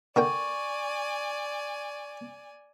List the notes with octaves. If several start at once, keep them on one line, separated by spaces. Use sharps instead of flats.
D3 A#4 D5 G5 G#5 C#6